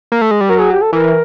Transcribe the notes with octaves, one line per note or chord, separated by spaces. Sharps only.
A#3
A3
G#3
G3
F#3 A#4
G#4
G4
A4
E3 A#4